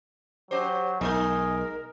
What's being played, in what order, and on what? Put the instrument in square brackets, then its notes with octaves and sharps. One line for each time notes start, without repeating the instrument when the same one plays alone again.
[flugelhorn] F#3 [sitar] C#4 G4 C5
[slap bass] B1 [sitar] G#3 D#4 [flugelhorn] G#4 [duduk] A#4